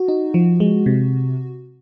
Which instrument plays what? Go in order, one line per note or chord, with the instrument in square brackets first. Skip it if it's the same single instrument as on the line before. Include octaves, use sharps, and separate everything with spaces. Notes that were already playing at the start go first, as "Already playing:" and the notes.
Already playing: [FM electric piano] F#4
D#4
F3
G#3
C3